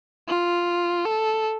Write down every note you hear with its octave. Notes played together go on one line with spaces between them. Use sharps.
F4
A4